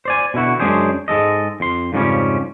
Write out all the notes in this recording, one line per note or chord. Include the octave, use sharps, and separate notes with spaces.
C5 D5 G#5
B2 D3 E4 F#4
F#2 G#3 C#4 D4 G#4 C5
G#2 G#3 A4 D#5
F2 C6
F2 G#2 C#3 F3 G3 C#4